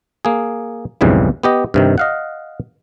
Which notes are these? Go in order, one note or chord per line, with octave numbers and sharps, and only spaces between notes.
A#3 G#4
B1 F2 G#2 C#3 E3 G3
B3 G4 D#5
G2 C3 D#3
D#5 F5 F#5